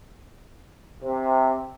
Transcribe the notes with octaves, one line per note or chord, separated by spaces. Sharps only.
C3